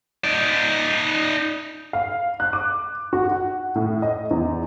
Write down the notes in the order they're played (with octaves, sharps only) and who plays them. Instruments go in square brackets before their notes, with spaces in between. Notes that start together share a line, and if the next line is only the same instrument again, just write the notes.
[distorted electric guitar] D#4 D5
[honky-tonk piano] F5
F#6
D6
F#4
F#5
A2
D#5
E2